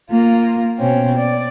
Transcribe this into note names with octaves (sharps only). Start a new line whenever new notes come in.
A#3 F4
B2 C4 C#4
D5